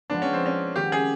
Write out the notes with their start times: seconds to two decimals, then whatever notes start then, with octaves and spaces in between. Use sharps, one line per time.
0.10 F3 G#3 B3 D4
0.22 C#4
0.33 C4
0.46 C#4
0.75 D#3 G#3 C#4 F#4 G4
0.92 G#4